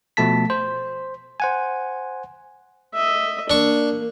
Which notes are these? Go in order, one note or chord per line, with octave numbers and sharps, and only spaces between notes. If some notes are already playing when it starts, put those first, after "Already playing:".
B2 F3 A3 A5 B6
C5
C5 F#5 G#5
D#5 E5
A#3 D4 C#6